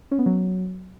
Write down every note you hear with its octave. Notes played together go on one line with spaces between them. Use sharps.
C#4
B3
F#3